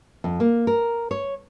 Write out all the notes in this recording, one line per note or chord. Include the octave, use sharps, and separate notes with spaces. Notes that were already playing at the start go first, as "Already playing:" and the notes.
F2
A#3
A#4
C#5